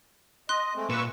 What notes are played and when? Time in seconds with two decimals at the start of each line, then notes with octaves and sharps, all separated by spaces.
0.49 D#5 C6 F#6
0.75 G#3 A3 C4
0.89 A#2 B4 C#6 E6